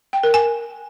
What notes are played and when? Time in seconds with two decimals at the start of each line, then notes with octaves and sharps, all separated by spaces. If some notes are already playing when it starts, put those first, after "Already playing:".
0.13 G5
0.23 A#4
0.34 G#5